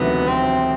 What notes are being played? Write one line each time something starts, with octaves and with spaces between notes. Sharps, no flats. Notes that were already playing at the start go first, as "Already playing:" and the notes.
Already playing: E1 D2 C3 D#3 F#3 B3
C4